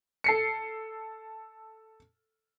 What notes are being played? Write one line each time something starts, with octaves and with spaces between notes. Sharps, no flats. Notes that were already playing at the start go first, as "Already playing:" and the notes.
A4 C7 C#7